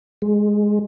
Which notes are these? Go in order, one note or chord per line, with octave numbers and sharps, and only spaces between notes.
G#3